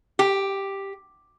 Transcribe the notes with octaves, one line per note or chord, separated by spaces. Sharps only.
G4